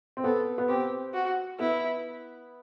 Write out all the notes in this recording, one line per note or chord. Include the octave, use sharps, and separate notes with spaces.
C4
B3 A4
B3
C4 G4
F#4
B3 E4